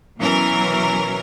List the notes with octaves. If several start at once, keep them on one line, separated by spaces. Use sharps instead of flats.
B2 E3 F#3 C#4 A#4